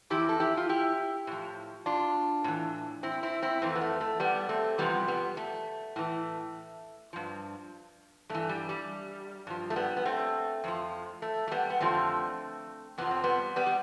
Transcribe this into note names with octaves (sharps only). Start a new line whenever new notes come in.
F2 E3 E4 G4
A4
E4 G4
F4
E4 G4
A2 F3
D4 F4
A2 E3
C4 E4
C4 E4
C4 E4
F2 E3 A3 C4
B3
A3
A3
G3 B3
A3 C4
E2 C3 F3 G3 B3
G3 B3
A3
A2 E3
G2 F3
G2 E3 A3
G3
G3
G2 F3
A3
G3 B3
B3
A3 C4
F2 D3 F3
A3
A3
G3 B3
B3
F2 D3 F3 A3 C4
F2 C3 F3 B3
C4
G3 B3
G3 B3
G3